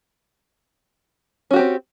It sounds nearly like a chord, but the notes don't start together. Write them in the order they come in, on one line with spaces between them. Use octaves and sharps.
C#4 F#4 G4 C4